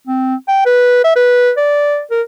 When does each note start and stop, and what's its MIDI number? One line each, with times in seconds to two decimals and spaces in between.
0.07 0.35 60
0.48 0.65 79
0.66 1.02 71
1.04 1.16 76
1.16 1.52 71
1.57 2.02 74
2.11 2.22 70